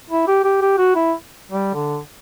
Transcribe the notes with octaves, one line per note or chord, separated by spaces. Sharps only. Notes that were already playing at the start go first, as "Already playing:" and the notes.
E4
G4
G4
G4
F#4
E4
G3
D3